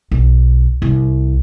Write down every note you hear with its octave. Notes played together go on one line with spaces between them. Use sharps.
B1
C2